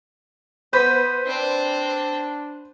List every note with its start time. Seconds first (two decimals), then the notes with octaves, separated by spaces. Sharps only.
0.73 B3 B4 C5 G6 B6
1.26 C4 D4